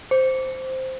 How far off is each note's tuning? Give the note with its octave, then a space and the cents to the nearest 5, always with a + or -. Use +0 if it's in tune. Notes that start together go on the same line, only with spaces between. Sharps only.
C5 +0